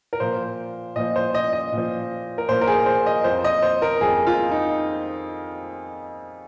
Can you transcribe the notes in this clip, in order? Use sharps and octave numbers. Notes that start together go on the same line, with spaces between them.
A#4
A#2 F3 C5
A#2 F3 D#5
C5
D#5
D#5
A#2 F3
A#4
A#2 F3 C5
A#4
G#4
C5
D#5
F2 F3 C5
D#5
C5
A#4
F2 F3 G#4
F4
D#4